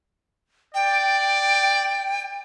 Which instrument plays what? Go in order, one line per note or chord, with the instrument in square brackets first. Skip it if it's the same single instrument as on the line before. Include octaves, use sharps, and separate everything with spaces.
[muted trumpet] D5 [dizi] G5